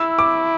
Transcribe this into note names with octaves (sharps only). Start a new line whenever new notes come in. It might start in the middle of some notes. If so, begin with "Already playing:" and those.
Already playing: E4 E6
D6